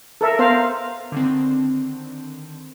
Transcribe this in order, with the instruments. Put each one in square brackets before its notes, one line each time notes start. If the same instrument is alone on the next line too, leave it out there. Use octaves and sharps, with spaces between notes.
[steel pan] A4 A#4 E5
[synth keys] B3 [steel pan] A#4 C5 F5
[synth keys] D3 D#3 C4